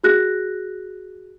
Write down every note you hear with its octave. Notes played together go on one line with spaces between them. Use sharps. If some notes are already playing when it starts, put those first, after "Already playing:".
F#4 G#4 F#6 A#6